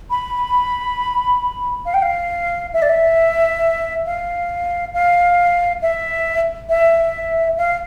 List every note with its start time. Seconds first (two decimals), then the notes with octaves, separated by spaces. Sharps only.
0.10 B5
1.85 F5
1.94 G5
2.02 F5
2.73 E5
2.82 D5
2.89 E5
4.06 F5
4.94 F5
5.82 E5
6.69 E5
7.57 F5